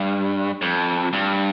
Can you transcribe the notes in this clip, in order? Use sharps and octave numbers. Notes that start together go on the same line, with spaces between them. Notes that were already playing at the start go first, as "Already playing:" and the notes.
Already playing: G2
F2
G2